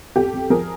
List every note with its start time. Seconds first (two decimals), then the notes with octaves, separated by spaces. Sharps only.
0.16 F2 G4 A4
0.33 F2
0.50 F3 G#4 A#4